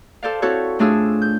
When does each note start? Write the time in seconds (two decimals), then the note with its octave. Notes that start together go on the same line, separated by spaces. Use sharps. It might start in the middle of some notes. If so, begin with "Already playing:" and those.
0.23 A4 C5 D5 F5
0.42 C4 E4 F#4 A4 C#5
0.79 A2 A3 D4 F4 G#4 E6
1.22 G6